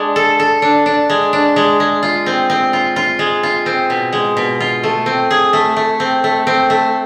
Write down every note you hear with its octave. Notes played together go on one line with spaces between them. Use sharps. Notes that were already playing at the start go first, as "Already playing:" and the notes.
Already playing: G#3 D4
A4
A4
D4
D4
G#3
D4
G#3
G#3
F4
C4
C4
F4
F4
G#3
F4
C4
B2
G#3
B2
F4
A3
C4
G#4
A3
A3
C4
A3
C4
A3